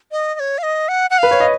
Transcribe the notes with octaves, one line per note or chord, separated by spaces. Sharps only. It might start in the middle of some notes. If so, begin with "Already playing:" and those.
D#5
D#5
C#5
F5
D#5
F#5
F#5
B4 F5
C#5
D#5